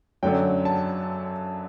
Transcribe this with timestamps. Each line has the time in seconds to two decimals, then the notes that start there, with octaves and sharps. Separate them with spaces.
0.23 F#2 D3 F#3 G5
0.65 A5